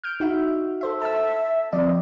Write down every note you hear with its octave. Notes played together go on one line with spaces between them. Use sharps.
F6 G6 D7
D#4 F#4 E5
A4 C5 E5
E5 A5 E6
F3 C4 D5 D#5